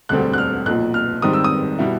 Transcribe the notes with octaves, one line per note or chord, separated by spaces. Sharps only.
E1 D2 D3 G3 C4 F#6
F#6
F6
B1 A#2 F3 F#6
F6
G#2 D#3 G3 C4 D#6
E6
D#6
B2 G3 B3 E4